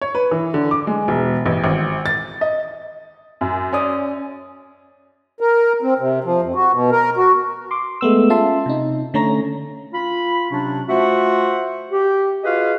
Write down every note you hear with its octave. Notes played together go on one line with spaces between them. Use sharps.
C#5
B4
E3
D3
D6
G#3
E1
A1
G#1
A6
D#5
F#2
C#4 D5 D#6
A#4
C4
C3
F3
F2
F#4
B2
A#4
F#4
C6 D6
G#3 A3 B3 E6
C#4 F4 E5 A5 C6
C3 D#4
D3 A3 C#4 C#5 A#5 A#6
F4 B5
C3 F#3 C#4 D4
A3 F4 F#4 C5 E5 F#5
G4
F4 F#4 G#4 B4 D#5 F5